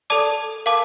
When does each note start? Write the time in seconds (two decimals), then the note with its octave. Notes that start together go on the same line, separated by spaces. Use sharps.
0.10 A4 D5 A5 D6
0.66 A#4 F5 A5 D6